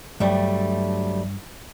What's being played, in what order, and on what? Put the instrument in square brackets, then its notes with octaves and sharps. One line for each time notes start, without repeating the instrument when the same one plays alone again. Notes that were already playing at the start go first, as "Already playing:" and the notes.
[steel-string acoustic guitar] D2 G3 A3 [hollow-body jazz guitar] G2 [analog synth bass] F#3